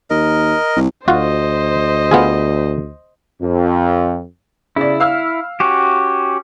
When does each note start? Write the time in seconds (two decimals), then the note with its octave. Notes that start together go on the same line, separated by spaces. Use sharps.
0.10 D#2 A#4 D#5
0.76 C2
1.08 D2 F4 F#4 C5 D#5
2.11 B3 F4 G#4
3.41 F2
4.76 C#3 E4 D5
5.00 F5 E6 F6
5.60 C#4 F#4 G4